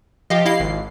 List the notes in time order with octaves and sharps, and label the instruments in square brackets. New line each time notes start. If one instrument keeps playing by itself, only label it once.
[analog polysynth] F3 G4 [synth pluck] D#5 F5
[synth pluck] E4 D#5 F5 [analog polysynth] C7
[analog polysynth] G#1